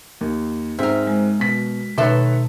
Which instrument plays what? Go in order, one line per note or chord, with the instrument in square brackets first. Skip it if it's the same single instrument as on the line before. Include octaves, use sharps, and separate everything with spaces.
[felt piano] D#2
[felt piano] G#2 C4 [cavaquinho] A#4 E5
[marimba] G#3
[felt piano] B2 B6
[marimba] B2 [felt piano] D#3 B4 C#5 [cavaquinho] A4 E5 C6